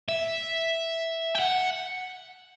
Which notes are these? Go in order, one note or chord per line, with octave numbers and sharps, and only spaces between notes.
E5
G5
F#5